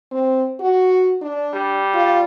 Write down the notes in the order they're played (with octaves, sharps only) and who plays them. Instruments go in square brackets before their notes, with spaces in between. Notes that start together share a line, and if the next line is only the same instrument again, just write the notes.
[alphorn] C4
F#4
D4
[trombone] G3
[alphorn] F4